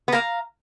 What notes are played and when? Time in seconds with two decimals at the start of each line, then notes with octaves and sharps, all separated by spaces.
0.08 B3
0.12 A#3 F5 A#5